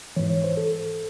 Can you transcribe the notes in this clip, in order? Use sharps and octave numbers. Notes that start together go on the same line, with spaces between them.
G#2 E3 C#5
C#5
C5
A4